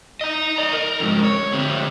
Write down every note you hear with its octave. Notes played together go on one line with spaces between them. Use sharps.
D#5 A#5
D5 D#5
A#4
F2 G#2
C#5
D3 C4